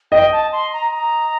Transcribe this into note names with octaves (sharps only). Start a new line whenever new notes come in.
D#5 G5
A5
C6
A#5
A#5